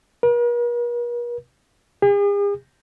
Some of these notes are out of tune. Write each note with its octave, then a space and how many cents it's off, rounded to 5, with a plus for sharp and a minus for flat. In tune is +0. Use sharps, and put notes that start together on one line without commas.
A#4 +45
G#4 -45